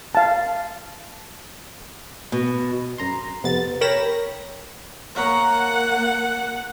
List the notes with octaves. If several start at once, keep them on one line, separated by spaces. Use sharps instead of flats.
F5 A5
B2
F#2 A#5 C6
F2 C3 B3 A6
A#4 C#5 G5 B5 A#6 E7
A#2 A#3 C#5 F#5 A#5